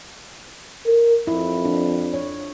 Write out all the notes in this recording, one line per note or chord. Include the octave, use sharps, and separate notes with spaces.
A#4
F2 E4
D4
C#5